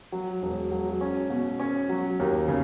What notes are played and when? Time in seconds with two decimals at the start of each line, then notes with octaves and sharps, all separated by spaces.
0.12 F#3
0.42 E1
0.71 F#3
1.01 C#4
1.30 B2
1.59 C#4
1.89 F#3
2.20 D#2
2.48 C#3